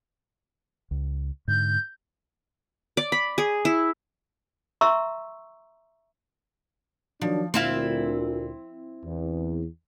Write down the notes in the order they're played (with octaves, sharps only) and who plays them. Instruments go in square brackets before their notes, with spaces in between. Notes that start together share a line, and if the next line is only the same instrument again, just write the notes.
[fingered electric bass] C#2
[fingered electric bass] G#2 D3 [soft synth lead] G6
[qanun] D5
B5
G#4
E4
[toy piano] E5 A#5 C6 C#6 E6
[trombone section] D#3 F#3 D4 [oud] F3
[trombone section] D2 A#2 [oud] C4 E4 F5
[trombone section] E2